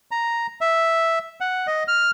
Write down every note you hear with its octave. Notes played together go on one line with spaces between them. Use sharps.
A#5
E5
F#5
D#5
F6